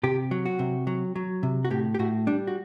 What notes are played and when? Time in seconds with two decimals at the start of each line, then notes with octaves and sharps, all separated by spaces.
0.03 C3 G4
0.31 F#3
0.46 F#4
0.59 C3
0.87 F#3
1.16 F#3
1.43 C3
1.65 F#4
1.70 A2 G4
1.95 G4
1.99 A2 F#4
2.27 G3 D4
2.47 F#4